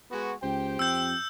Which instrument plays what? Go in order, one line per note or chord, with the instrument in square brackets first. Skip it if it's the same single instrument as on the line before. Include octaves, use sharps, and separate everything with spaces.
[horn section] G#3 B3 F#4
[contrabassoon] C#2 [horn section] G4 C5 G5
[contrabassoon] F2 [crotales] E6 G6